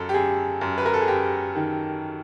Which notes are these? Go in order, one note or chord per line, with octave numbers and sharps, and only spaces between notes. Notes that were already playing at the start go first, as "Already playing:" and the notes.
Already playing: F#2 A4
G4
F#2 G#4
F#2
B4
A#4
A4
G#4
F#2 G4
D#3